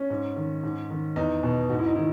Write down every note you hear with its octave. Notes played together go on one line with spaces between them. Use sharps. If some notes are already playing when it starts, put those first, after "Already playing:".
Already playing: C#4
G#2
D#3
G#2
D#3
E2 D#4
B2
G#2 F#4
E4
D#4
D#3 E4